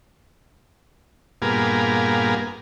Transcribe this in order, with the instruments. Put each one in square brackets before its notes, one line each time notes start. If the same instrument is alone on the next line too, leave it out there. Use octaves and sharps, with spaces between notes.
[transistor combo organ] G2 A#2 A#3 B3 F4 G#4